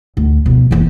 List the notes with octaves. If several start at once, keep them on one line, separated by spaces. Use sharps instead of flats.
D2
B2 F3
F#1 E2